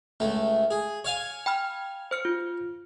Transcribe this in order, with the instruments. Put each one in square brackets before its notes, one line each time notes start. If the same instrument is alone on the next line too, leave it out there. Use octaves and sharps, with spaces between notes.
[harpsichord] C#2 A3
G#4
C#5 F5 G#5
[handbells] G5 B5 F6
C5 F6 C#7
F4